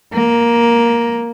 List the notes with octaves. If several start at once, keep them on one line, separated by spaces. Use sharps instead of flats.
A#3